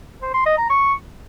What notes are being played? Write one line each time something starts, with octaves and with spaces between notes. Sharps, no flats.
C5
C6
D#5
A#5
C#6